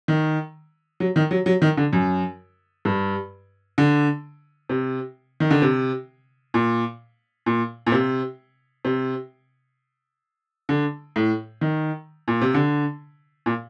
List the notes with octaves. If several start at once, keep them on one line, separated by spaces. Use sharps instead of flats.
D#3
F#3
D#3
F#3
F#3
D#3
D3
F#2
G2
D3
C3
D#3
D3
C3
A#2
A#2
A#2
C3
C3
D3
A2
D#3
A#2
C3
D3
A#2